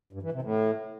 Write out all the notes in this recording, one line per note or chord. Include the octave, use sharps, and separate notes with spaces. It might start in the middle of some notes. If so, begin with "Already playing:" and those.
G2
E3
C3
A2